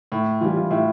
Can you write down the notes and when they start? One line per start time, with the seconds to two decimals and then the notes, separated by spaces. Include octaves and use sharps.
0.12 A2
0.41 E3 G3 F4
0.57 F4
0.70 A2 E4